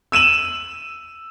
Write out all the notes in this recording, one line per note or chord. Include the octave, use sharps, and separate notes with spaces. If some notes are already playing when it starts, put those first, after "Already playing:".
E6 D#7 E7 F#7